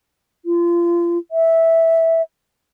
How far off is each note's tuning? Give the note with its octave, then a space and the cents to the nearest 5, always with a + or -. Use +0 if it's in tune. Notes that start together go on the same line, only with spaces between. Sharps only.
F4 -30
E5 -10